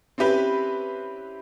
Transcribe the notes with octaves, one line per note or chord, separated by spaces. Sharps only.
C4 C#4 E4 G4 B4